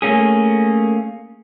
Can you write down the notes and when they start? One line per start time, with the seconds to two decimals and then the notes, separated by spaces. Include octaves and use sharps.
0.02 A3 A#3 C#4 G#4